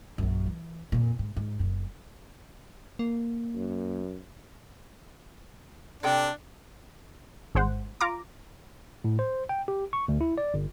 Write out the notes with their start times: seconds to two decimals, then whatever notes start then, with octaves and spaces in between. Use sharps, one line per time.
0.18 A#1 F#2
0.47 E3
0.92 F2 A#2
1.19 G#2
1.36 G#2
1.59 F#1 F#2
2.99 A#3
3.55 F#2
6.03 C3 D4 A4 G5
7.55 G#1 G#3 C5 F#5
8.01 F4 A#5 D6
9.04 A2
9.19 C5
9.49 G5
9.68 G4
9.93 C#6
10.08 D2
10.21 E4
10.38 D5
10.54 G1